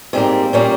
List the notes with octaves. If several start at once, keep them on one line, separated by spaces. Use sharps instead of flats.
G#2 G3 A#3 C4
A#2 G3 A#3 C#4